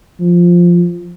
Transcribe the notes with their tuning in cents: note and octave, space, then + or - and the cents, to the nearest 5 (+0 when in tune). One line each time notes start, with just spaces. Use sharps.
F3 +0